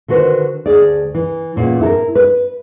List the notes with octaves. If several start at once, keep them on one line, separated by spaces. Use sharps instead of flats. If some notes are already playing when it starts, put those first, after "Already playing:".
D3 D#3 F#4 B4 C5
D2 G#4 D5
E3
E2 A#2 C#4
E4 A4 A#4
B4